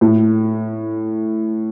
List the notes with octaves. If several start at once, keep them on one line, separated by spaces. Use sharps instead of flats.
A2